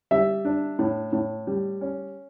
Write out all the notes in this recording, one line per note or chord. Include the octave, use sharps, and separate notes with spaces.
G3 E5
D4
A2
A2
G3
C#4